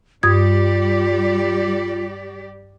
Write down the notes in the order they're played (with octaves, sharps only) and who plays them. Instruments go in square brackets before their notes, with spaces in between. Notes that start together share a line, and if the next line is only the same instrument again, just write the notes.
[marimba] G2 D#6 G#6 [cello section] G3 G4 D5 [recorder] F4